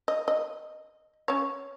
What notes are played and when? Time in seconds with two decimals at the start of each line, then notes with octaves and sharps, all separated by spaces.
0.08 D#5
0.28 D#5
1.28 C#4 C#5